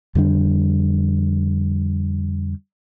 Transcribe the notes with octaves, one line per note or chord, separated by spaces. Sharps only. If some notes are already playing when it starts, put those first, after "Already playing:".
F2 D3 G3 D4